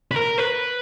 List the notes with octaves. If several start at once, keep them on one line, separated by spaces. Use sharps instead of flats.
B4
A#4
B4